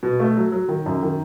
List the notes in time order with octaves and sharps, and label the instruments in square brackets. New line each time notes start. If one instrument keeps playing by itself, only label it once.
[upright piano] B2
A3
F#3
F#3
D#3
F#2
D#3